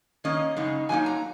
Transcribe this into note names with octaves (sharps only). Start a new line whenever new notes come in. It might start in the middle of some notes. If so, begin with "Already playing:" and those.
D#3 A#3 C#4 D#5
F#2 C#3 G#3 D#4
F#2 F#3 A#3 D#4 G#5
A#5